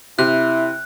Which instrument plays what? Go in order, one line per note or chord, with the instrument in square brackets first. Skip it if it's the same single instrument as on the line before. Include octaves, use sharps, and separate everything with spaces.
[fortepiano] C3 [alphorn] E4 [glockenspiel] F#6